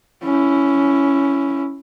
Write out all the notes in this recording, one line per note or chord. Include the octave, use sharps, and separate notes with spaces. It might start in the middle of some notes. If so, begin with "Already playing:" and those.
C#4 E4